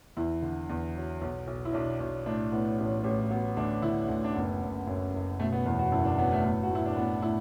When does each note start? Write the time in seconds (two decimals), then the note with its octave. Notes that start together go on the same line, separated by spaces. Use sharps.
0.17 E2 E4
0.42 D3
0.69 E2
0.96 F#3
1.21 B1
1.47 B1
1.65 E4
1.73 B1 D4
2.00 B1
2.26 A2 D4
2.52 A2 B3
2.78 A1
3.04 A1
3.30 F#3 B3
3.57 D2 D4
3.82 D3 E4
4.08 D2
4.24 D4
4.35 F#1 B3
4.62 F#1
4.87 F#2
5.13 F#1
5.39 B2 A3
5.52 B3
5.66 E2 B3
5.79 F#4
5.92 F#1 E4
6.05 D4
6.18 F#3 B3
6.32 A3
6.44 A2 B3
6.63 F#4
6.70 A2 E4
6.86 D4
6.96 A2 B3
7.22 A2 E4